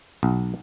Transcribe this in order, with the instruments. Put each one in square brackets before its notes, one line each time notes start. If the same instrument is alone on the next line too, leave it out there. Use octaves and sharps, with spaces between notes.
[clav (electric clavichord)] B1